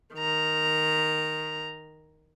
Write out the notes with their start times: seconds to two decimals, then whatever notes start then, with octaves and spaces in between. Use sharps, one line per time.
0.15 D#3 A#5